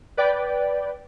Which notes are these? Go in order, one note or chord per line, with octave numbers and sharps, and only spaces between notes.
B4 D5 G5